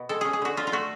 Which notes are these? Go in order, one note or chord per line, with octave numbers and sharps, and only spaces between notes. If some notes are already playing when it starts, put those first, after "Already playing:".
Already playing: B2
G#3 A4
C#4 G#4
G#4
D3 F#4
F#3 F4
F4
A3 F#4